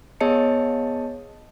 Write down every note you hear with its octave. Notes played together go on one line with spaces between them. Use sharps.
B3 G#4 C#5 D#5 A5 C#7